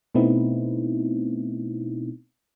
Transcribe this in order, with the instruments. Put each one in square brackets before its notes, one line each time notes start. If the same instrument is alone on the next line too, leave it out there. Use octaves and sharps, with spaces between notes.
[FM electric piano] B2 A3 B3 C4 D#4 E4